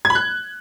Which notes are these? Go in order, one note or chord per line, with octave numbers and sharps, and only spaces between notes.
G#6
B5
F#6